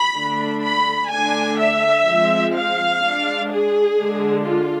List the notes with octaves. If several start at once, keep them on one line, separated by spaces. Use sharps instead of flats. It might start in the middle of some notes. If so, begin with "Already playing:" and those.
Already playing: B5
D3 A3 D4
B5
D3 A3 D4 G#5
E5
F3 G#3 C4
F5
G#3 D4
G#4
D3 G#3 D4
F4